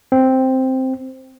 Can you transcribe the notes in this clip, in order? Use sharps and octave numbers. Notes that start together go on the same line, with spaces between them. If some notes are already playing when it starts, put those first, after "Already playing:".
C4